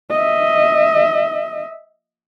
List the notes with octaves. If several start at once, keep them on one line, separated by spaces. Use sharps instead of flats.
D#5 E5